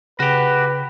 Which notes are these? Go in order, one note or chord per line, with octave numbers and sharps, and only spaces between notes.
C#3 F#4 G4 B4